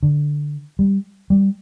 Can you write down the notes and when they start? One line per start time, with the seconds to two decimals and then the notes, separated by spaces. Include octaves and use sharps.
0.03 D3
0.79 G3
1.30 G3